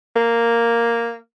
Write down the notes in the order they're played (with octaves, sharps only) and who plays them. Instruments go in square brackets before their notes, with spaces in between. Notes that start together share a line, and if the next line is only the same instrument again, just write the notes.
[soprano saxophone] A#3